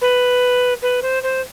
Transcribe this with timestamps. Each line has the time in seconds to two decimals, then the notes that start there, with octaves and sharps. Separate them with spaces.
0.01 B4
0.82 B4
1.02 C5
1.23 C5